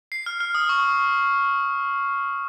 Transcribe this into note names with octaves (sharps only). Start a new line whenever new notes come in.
C7
F6
F6
D#6
C#6